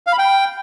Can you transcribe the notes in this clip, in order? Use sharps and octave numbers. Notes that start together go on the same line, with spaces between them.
F5
B5
G5